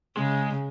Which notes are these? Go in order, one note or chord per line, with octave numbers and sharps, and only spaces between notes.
C#3 G#3